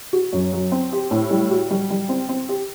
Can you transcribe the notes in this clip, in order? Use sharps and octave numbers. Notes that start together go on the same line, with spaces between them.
F#4
F#2
F#3
C4
G4
A2
G3
F#4
G3
G3
C4
C4
G4